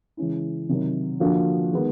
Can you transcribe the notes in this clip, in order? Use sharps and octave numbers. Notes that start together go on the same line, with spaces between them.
C#3 E3 G#3 C#4 E4
C3 D#3 F#3
D3 F3 A#3 D4 F#4
D#3 G#3 B3